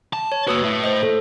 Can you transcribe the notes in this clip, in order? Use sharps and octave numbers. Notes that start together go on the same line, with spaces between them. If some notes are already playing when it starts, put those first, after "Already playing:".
A5
C#5
A#3 F#4 B4 D#6 E6
A2
C5 D#5
A4